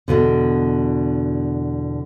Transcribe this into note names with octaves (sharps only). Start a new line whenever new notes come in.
E2 G#2 B2 D3